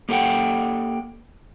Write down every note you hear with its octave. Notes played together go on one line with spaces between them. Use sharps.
A#3 G4 A4 F#5 G5